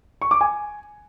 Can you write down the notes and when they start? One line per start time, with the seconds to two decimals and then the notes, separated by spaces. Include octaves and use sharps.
0.22 C#6
0.31 D6
0.41 G#5